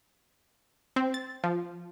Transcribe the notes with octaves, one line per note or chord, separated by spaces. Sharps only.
C4
A6
F3